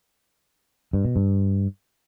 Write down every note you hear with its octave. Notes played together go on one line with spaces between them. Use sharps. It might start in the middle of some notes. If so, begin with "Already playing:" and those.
G2
B2
G2